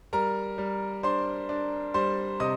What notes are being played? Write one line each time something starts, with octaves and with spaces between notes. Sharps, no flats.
G3 A#4 A#5
G3
D4 C5 C6
D4
G3 C5 C6
C3 D#5 D#6